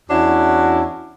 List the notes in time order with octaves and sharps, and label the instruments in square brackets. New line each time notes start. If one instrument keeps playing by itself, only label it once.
[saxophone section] E2 C#4 D4 E4 F#4